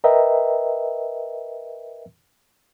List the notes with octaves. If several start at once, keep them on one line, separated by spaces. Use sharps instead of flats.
A#4 B4 D#5 E5 G5 A#5